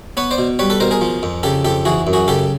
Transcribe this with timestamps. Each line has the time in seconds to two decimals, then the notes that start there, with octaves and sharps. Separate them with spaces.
0.17 B3 B4 C#5
0.31 C5 D5
0.38 B2
0.59 G3 B4 C#5
0.70 A4 B4
0.80 B2 A#4 C5
0.91 G#4 A#4
1.01 F3
1.23 F2
1.43 C#3 G4 A4
1.65 F2 G4 A4
1.85 E3 F#4 G#4
2.07 F#2
2.13 F#4 G#4
2.28 C#3 G4 A4